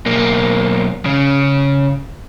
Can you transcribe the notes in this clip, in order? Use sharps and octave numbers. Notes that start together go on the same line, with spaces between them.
B1 A#3
C#3